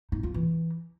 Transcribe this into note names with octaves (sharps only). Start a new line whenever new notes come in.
D#4
F4
E3